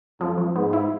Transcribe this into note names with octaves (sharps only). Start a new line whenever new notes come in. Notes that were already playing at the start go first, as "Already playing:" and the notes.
F2 F3
F3
G#2 B3
E4